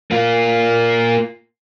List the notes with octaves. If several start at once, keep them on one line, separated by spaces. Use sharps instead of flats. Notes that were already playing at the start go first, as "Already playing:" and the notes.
A#3 F4